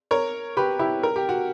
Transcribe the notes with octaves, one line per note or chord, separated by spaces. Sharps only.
A#4 C#5
G4 B4
E4 G4
A#4
G4
F#4